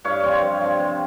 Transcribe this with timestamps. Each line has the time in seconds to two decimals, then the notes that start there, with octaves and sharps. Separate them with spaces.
0.04 G2 C#5 F5
0.23 F3 C4 C#5 F5
0.42 G2
0.60 F3 C4
0.79 C3